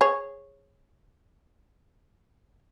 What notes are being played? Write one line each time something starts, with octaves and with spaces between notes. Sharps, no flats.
G#4 C#5